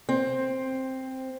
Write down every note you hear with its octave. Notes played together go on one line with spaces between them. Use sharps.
C4